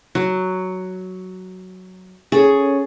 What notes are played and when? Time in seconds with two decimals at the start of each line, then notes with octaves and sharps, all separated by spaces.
0.15 F#3
2.32 C#4 G#4 A4 C#5